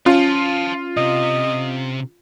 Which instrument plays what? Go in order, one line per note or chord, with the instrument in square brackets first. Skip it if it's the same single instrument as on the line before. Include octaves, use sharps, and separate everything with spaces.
[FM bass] C#4 [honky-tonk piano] F4 [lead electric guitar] F5 A5
[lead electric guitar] C3 [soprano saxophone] D#5